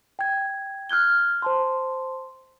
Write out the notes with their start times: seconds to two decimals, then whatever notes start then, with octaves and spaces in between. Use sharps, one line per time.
0.19 G5 G#6
0.90 F6 F#6 G#6 G7
1.42 C5 A5 C6